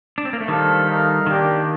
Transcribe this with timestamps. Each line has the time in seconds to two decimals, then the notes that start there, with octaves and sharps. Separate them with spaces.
0.18 D4
0.25 C4
0.33 A#3
0.41 A3
0.48 D#3 G3 D4 A4 C5 F5
0.88 A3 D#4 A#4 F5
1.26 D#3 A#3 D4 G4 D5